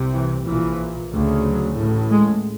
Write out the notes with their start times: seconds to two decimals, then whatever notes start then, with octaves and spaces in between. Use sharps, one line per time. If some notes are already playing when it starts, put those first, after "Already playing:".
Already playing: C2 C3
0.13 E3
0.46 A#1 A#2 E3
1.11 D2 C#3
1.44 F#3
1.77 A1 A2
2.10 G#3